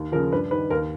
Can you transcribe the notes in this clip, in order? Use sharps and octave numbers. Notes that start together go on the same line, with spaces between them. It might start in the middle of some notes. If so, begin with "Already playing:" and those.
Already playing: D#2
C#3 F3 A#4
G2 B4
D#3 B4
D#2 A#4